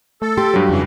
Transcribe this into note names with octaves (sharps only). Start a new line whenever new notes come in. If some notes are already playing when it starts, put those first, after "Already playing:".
A3 A4
G4 C6
G2 F#3
F2 C#3 E3